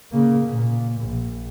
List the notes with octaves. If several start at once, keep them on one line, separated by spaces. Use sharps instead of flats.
C#3 A#3
A#2
A#1